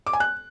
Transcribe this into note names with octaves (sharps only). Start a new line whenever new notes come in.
D6
G#5
F#6